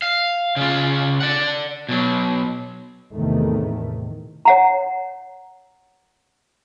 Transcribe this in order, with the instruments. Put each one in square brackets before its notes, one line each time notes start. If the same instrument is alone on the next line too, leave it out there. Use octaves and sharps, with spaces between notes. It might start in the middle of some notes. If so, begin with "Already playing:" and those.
[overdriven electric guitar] F5
C#3 F4
D5 F#5
B2 F#3
[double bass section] E2 A2 C3 D#3 A3
[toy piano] C#5 F#5 A#5